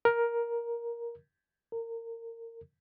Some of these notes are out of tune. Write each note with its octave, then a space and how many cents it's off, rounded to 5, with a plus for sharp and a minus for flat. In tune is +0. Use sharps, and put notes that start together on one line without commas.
A#4 +10
A#4 -25